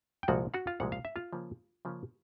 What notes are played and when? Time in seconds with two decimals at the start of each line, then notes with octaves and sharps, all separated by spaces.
0.23 G5
0.28 C2 A#2 F3 G#3 F#4 F#5
0.54 F#4 F#5
0.67 F4 F5
0.80 C2 A#2 F3 G#3 F#5
0.92 F5
1.05 E5
1.16 F4 F5
1.33 C#3 F3 A#3 C#4
1.85 C#3 F3 A#3 C#4